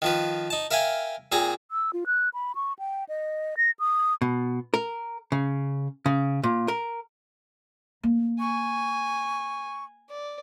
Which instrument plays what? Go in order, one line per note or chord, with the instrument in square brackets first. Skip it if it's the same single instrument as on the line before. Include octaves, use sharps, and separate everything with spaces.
[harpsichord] D#3 F3 B4
D#4 A5
A#4 E5 F5 G5 G#5
A#2 C4 G#4 A#5
[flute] E6
F4
F#6
B5
C#6
G5
D#5
A#6
D#6
[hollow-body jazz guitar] B2
A#4
C#3
C#3
A#2
A#4
[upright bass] A#3
[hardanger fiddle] G#5 [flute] C#6
[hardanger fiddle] D5